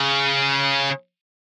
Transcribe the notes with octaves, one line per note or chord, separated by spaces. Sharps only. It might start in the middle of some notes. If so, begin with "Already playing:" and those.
Already playing: C#3